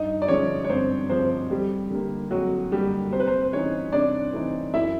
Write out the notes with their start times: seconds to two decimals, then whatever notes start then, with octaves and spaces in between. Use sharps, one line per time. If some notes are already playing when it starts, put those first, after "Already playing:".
Already playing: G2 D#4 D#5
0.22 D5
0.28 D3 F3 G#3 C#4 C#5
0.64 C#5
0.69 G2 C4 C5
1.09 D3 F3 G#3 C4 C5
1.50 F2 G3 G4
1.90 D3 G3 A#3
2.31 F2 F#3 F#4
2.71 D3 G3 A#3 G4
3.12 C3 C5
3.20 B4
3.27 C4 C5
3.53 E3 A3 C4 C#4 D#4 C#5
3.92 C3 D4 D5
4.33 E3 A3 C4 D#4
4.73 F#2 E4 E5